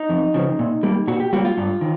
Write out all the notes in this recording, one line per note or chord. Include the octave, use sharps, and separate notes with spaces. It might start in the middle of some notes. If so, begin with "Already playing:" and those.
Already playing: D#4
F2
C#3 F3
A#2
G3 A#3
A#2 F#4
G4
G3 A#3 F#4
F4
G2
D#3